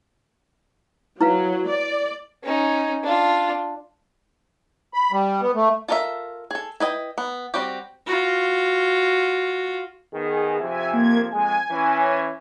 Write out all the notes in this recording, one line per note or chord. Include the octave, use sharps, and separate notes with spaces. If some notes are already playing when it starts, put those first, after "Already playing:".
F#3 E4 B4 F5
D5
C#4 D#4
D4 F4
B5
G3
B3
A3
F4 A4 A#4 D#5 E5
G#4 A4
E4 B4 D#5 G5
B3
G3 C4 F#4 G4
F4 F#4
D#3 B3 G#4
F2 C3 F3 E5 G#5
A#3 G#6
F2 G#3 G#5
E3 C#4